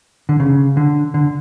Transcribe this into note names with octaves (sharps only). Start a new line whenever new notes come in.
D3
C#3
D3
D3